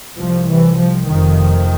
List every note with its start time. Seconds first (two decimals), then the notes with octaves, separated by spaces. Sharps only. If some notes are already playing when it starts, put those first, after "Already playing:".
0.19 C2 C3 F3
0.48 E3
0.78 F3
1.07 F1 F2 C3 D#3